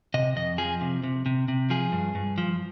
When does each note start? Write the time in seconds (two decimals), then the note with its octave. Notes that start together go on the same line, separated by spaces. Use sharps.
0.14 C3 D#5
0.36 F2 D#5
0.58 F3 G#4
0.81 C3
1.04 C3
1.26 C3
1.48 C3
1.70 F3 G#4
1.92 G2
2.15 G2
2.38 F3